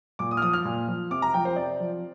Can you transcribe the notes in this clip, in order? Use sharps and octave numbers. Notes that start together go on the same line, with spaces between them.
A#2 D6
D#6
F6
F3 D#6
F6
A#2
F3
C3 D6
A#5
F3 G5
C5
C3 D5
F3